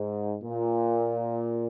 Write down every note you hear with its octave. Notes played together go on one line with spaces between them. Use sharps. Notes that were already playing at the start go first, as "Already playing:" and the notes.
Already playing: G#2
A#2